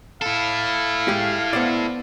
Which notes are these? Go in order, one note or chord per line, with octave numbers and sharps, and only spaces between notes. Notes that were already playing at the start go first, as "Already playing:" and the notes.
E4 A4 F5
G#3 G4
B3 C5 D5